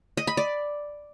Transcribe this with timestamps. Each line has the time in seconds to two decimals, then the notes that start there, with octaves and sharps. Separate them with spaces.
0.17 D#5
0.27 B5
0.37 D5